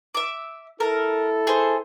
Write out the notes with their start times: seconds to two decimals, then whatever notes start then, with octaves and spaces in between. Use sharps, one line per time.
0.15 E5 D6
0.80 E4 A4 A#4
1.47 G#4 C5